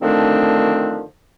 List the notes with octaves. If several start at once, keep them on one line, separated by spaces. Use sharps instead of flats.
D3 D#3 F3 A3 C4 D4